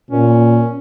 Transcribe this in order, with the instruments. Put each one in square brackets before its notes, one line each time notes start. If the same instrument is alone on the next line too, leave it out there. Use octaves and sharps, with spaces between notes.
[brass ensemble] A#2 [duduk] C#4